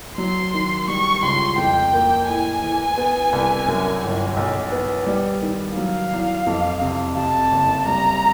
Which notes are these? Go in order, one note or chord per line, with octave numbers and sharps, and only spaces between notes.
F#3 C6
D#3
G3 C#6
C#2 C6
F2 G5
A#3
A2 G#5
E3
B3
C2
F#2
G1
B1
B3
G3
D#3
F#3 F5
E2
F2
C3
C3 A5
F#1
G3 A#5